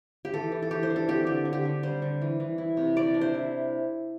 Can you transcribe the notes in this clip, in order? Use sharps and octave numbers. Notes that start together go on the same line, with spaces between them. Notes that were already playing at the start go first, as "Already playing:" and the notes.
G4
E3 A4
E3
A4
E3 G4
C5
D4
A4
C4 G4
D3 G4
D3
G4
D3
G3 C5
D3
E3
E3
E4
C3
C3 D5
D4
C5
E4